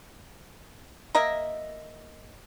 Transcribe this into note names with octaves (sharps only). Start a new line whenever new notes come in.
A#3 A#4 D#5 E5